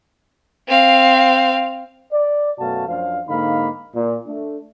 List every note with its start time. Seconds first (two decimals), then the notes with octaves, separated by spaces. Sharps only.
0.68 C4 F5
2.13 D5
2.60 F#2 B2 A3 F#4 F5 A5
2.89 F#2 F3 D4 C5 F5
3.28 G#2 D3 A#3 D#4 F5 B5
3.95 A#2
4.27 A3 D4